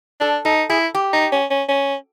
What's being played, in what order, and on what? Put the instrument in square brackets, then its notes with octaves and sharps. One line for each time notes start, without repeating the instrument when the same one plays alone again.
[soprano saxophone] D4 [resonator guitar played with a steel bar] A4
[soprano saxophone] D#4 [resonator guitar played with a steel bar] A4
[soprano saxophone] E4 [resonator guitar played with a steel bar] G#4
[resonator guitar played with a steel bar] G4
[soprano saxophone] D#4
C#4
C#4
C#4